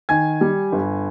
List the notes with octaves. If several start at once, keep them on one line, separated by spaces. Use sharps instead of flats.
D#3 G#5 G#6
G3
G1